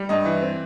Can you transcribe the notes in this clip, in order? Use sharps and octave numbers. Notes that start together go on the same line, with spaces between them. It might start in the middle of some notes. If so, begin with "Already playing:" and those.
Already playing: G3
G2 D#5
E3
C4